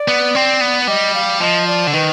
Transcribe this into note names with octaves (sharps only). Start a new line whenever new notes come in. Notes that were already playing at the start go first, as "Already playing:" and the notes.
Already playing: D5
B3
C4
B3
G3 D#5
F5
F3 D#5
D5
D3
D#3 B4